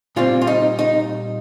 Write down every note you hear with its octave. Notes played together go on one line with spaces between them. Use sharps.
A#2 G3 C4 F4
F4
D#4
D#4